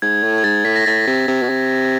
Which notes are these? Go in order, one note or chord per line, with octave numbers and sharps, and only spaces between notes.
G#2 G#6
A2
G#6
G#2 A6
A2 B6
A#6
A2 A6
C3
C3
B2
C3